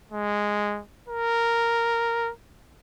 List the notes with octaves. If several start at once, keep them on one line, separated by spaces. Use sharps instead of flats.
G#3
A#4